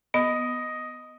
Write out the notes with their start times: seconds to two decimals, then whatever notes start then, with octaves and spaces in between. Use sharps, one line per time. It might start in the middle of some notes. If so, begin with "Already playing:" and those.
0.14 B3 D#5